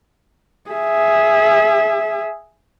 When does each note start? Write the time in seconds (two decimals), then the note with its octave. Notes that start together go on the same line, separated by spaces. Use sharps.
0.71 G#4 E5